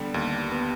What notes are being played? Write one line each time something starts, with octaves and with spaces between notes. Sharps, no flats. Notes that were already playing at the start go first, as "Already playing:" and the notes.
Already playing: D3 G3 B3
D#2
B3